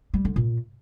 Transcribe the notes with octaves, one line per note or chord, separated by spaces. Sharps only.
G3
D3
A#2